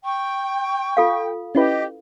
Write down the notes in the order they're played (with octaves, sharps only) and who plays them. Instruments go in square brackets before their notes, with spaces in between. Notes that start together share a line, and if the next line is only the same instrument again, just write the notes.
[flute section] G5 [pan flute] C#6
[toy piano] F4 A4 F5
[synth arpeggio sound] C#4 E4 B4 [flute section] G4 [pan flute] D#5